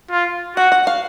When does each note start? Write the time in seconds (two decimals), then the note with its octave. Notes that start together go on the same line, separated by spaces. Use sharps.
0.11 F4
0.57 F#4 F#5
0.72 F#5
0.87 F5